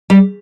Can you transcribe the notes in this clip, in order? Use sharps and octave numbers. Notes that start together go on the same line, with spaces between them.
G3